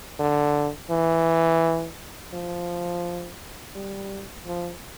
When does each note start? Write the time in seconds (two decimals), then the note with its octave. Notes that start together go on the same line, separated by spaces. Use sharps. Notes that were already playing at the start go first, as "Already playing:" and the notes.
0.19 D3
0.90 E3
2.33 F3
3.76 G3
4.47 F3